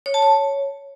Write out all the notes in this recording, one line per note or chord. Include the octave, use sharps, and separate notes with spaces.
C#5
A5
C#5